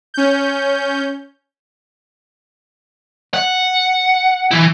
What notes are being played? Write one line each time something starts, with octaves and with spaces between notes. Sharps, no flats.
C#4 G6
F#5
E3 E4